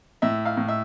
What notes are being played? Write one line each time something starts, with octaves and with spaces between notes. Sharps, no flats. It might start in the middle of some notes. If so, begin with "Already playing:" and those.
A2 E5
F5
A2
E5